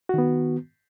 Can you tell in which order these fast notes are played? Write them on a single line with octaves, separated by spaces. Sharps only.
F#4 D#3 B3